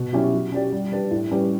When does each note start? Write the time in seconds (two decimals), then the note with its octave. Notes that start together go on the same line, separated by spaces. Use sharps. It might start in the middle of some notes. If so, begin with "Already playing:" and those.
Already playing: B2
0.13 F#3 C#4 E4 G4
0.33 F#3
0.52 C#4 G4 D5
0.72 G3
0.92 D4 G4 B4 D5
1.11 A2
1.31 G3 C#4 G4 B4